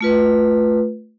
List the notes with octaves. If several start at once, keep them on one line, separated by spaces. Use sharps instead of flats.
A3 F4 B4